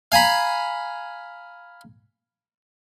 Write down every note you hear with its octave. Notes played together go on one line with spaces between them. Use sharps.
F5 G#5 A#5 B5